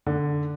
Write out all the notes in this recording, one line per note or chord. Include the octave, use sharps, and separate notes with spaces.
D3